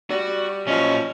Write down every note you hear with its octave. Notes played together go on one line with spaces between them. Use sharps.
G3 F#4
A#2 F3 F#3 C#4 D#5